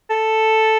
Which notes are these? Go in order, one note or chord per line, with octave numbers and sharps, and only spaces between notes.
A4